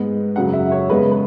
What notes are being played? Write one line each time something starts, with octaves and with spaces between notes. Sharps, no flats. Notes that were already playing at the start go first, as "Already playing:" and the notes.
Already playing: G#2 G#3 B3
F#2 C#3 F#3 F#5
E5
C#5
E2 C#3 G#3 B3 B4
B4